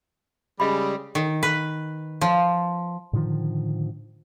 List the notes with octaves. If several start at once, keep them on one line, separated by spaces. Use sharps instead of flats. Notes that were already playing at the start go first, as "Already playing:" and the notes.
C#3 G3 G#3 D#5 B5
D#3
B4
F3
A2 D3 D#3 F3